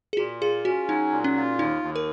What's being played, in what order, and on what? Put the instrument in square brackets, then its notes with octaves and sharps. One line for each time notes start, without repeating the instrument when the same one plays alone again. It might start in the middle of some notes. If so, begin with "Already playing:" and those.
[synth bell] G#4
[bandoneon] A#2 [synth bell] F#4
[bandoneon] F4 [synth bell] G#4
[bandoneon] C#4 [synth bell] F#4
[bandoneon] F#3 [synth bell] D#4
[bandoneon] A#2
[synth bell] C#4
[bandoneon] F4
[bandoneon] D#2 [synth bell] D#4
[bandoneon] D#2
[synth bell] A#4